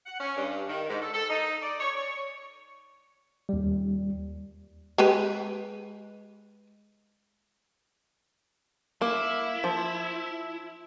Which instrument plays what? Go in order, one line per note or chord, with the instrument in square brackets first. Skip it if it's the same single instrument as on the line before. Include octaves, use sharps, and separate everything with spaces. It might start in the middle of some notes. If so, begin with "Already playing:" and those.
[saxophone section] F#5
C#4
G2
D#3
G#2
A4
A4
D#4
D5
C#5
C#5
[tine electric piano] D#2 G3
[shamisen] G#3 G4 B4
[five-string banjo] A#3 [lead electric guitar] E4
[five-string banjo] F3